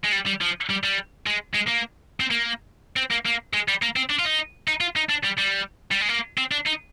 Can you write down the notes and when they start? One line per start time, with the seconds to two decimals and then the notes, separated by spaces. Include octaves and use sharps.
0.05 G#3
0.13 G3
0.27 G3
0.41 F3
0.70 G3
0.83 G3
1.27 G#3
1.55 G#3
1.68 A#3
2.20 C4
2.31 A#3
2.96 C4
3.11 A#3
3.26 A#3
3.53 G#3
3.68 G3
3.82 A#3
3.96 C4
4.10 D4
4.19 F4
4.25 D#4
4.68 D#4
4.81 F4
4.96 D#4
5.10 D4
5.24 G3
5.38 G3
5.92 G3
6.01 G#3
6.09 A#3
6.38 C4
6.52 D4
6.67 D#4